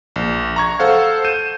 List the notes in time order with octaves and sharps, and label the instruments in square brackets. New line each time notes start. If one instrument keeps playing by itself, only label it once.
[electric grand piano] A#1
A#5 C#6 G#6
A4 C5 F5 F#5
G6 D#7 E7